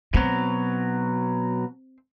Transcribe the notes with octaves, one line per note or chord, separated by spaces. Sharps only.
B2 F#3 C4